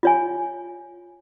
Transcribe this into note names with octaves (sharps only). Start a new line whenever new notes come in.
F4 C#5 G#5